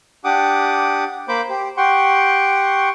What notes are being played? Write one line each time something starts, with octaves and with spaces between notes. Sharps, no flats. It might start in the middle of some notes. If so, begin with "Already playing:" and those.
D4 G4 F#5 D6 D#6
A#3 C5 B5 D6 G6
G4 C5
G4 F#5 G5 C6 C#6